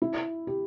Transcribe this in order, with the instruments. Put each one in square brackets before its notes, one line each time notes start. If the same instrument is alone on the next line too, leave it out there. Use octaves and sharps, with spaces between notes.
[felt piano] E4
G4